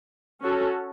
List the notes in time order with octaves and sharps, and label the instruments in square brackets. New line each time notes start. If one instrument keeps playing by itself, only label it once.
[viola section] C#4 F#4 A4